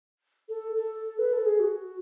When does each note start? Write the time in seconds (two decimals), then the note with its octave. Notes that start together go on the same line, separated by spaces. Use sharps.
0.49 A4
0.77 A4
1.19 B4
1.33 A4
1.46 G#4
1.60 F#4